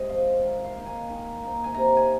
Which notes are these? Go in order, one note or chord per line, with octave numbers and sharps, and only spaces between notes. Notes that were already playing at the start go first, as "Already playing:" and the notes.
Already playing: G#2 C3 D#5
F3 C4 F5
D#3 F5
F5
A#3 D#4
G#5
D#3
A#3 D#4
G#5
C3 A#5
G#5